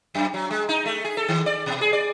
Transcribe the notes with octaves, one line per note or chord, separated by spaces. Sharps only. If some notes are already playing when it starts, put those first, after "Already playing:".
F#2
F#3
G#3
D#4
A3
G#4
A4
D#3
D5
B2
G#4
D5